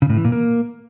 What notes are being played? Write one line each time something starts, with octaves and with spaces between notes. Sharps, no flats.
C#3
A2
E3
A#2
A#3